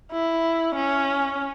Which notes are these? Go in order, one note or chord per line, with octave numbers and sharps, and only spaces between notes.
E4
C#4